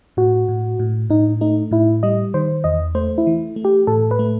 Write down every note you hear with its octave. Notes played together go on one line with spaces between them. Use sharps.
A2 F#4
A2
A2
A2 D#4
A3 D#4
A2 E4
G3 D#5
D#3 C5
E2 D#5
A3 C5
E4
E3
A3
G4
A2 A4
B4
A3